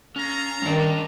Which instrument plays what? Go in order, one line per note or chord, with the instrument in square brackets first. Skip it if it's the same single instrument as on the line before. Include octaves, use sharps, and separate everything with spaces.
[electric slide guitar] C#4 [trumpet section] A4 F5 A#5
[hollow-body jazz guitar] G2 D4 [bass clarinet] D#3 [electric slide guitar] C#4 D#5